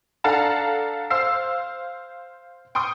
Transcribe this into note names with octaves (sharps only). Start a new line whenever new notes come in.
D4 A4 F5 F#5 A5 A#5
C5 F5 E6 C7
G5 C6 C#6 D#6